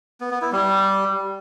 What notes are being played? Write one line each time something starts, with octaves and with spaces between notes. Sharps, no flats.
B3
B3
E4
G3